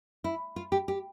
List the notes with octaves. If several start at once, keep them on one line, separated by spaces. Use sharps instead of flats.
E4
F4
G4
G4